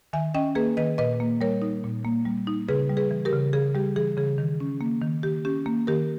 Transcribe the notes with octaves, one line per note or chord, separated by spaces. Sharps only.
D#3 E5 G#5
C#4 D#5 G5
A#3 G#4 B4
D#3 B4 D#5
A#2 B4 D#5
A#3
G3 A#4 C#5
D#4
A#2
A#3
G3
D#4
C#3 G#4 B4
G3
G#4 B4
E3
G4 A#4
C#3
C#3 G#4
G3 G4
E3 G#4
C#3 G#4
D#3
C#4
A#3
D#3
D#3 G4
C#4 G4
A#3
D#3 G4 A#4